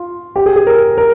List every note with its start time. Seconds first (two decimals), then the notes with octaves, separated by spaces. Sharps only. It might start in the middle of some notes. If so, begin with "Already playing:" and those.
Already playing: F4
0.36 G4
0.46 G#4
0.56 G#4
0.67 A#4
0.98 A#4